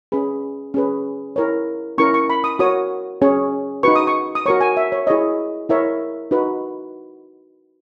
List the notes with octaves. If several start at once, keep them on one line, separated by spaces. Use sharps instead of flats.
C#4 G#4 B4 B5
C#4 G#4 B4
E4 A#4 C#5
C#4 E4 A#4 C#6
C#6
B5
D#6
F#4 A#4 C#5 D#6
C#4 G#4 C#5
D#4 F#4 B4 C#6
D#6
C#6
D#6
F#4 A#4 C#5 C#6
G#5
E5
C#5
E4 G#4 C#5 D#5
E4 A#4 C#5 E5
D#4 F#4 B4